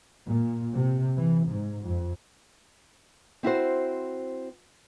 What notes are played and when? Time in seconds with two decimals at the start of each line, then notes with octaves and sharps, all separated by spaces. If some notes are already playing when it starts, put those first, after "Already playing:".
0.24 A#2
0.75 C3
1.16 E3
1.47 G#2
1.85 F2
3.43 C4 E4 F#4 C5